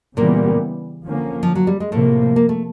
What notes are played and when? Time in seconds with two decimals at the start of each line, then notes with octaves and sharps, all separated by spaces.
0.17 A#2 C#3 E3 G3 A#3 B3
1.05 D3 F3 A#3 C#4
1.43 F3
1.55 F#3
1.67 G3
1.80 G#3
1.92 A2 C3 F3 A3 A#3
2.36 A#3
2.49 A3